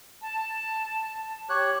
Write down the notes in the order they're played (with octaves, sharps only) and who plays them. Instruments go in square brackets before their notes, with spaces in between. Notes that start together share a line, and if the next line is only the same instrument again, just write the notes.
[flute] A5
[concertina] G4 C#5 F#6